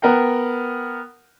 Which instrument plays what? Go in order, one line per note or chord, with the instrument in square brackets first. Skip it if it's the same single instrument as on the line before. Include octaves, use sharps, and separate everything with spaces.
[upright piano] B3 A#4 F#5 G5